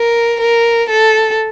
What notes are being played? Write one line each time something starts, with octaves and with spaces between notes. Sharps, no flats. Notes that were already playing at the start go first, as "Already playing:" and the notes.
Already playing: A#4
A#4
A4